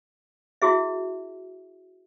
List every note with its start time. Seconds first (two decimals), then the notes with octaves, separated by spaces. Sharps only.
0.62 E4 F#4 G#4 E5